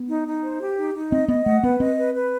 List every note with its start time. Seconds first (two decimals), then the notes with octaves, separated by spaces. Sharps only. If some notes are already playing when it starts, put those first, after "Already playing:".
Already playing: B3
0.08 D#4
0.26 D#4
0.43 C5
0.60 G4
0.78 D#4
0.94 D#4
1.12 C4 D#5
1.28 B3 D#5
1.46 A3 F#5
1.63 B3 B4
1.80 C4 D#5
1.97 B4
2.15 B4